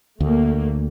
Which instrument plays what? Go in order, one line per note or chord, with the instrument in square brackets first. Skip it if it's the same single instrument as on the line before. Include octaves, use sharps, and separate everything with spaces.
[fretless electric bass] D2 [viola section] A3 A#3